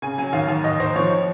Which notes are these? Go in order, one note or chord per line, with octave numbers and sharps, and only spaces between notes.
C#3 G#5
F#3 G#5
D#2 F5
D#2
D#2 D#5
D#2 C5
F3 C#5